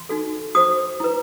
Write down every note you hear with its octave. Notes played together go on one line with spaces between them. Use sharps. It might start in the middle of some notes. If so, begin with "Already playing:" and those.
Already playing: C6
D#4 F#4 A4
F#4 C5 D#6
E4 B4